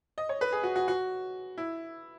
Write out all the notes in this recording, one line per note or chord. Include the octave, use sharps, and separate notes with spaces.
D#5
C#5
B4
G#4
F#4
F#4
F#4
E4